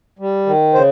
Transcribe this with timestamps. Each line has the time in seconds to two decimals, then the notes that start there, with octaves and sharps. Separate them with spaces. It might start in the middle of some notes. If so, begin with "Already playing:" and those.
0.19 G3
0.46 D#3
0.74 C#3 C5